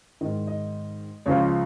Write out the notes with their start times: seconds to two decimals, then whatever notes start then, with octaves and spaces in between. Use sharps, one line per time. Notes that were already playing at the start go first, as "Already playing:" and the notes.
0.21 G#2 D#3 D#5
0.47 D#5
1.26 C#2 C#3 F3 C#5